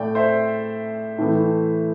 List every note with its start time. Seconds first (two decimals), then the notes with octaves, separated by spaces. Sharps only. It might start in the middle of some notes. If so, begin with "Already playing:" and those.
Already playing: A2 A3 D5 G5
0.15 C5 E5
1.19 A2 E3 A3